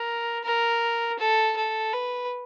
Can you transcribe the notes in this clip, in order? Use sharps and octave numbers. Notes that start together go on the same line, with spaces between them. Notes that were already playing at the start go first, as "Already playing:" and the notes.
Already playing: A#4
A#4
A4
A4
B4